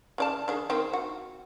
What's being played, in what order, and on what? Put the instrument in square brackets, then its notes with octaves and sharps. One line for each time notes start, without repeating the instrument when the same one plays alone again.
[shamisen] C#3 D5 A5
D#3 D4 G#4
D#3 C4
F#4